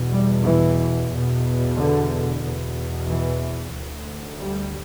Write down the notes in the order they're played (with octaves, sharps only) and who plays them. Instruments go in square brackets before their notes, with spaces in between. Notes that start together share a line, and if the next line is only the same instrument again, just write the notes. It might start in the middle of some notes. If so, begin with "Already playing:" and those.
Already playing: [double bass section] E2 B2
G3
E3
E2
B2
D3
E2 B2
E3
D2
G3